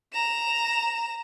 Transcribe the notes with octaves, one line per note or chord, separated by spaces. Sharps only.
A#5 E7